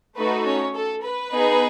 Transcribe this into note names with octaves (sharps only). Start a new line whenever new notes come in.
A3 D#4 F#4 A4 B4
C#4 C#5
A4
B4
B3 D#4 G#4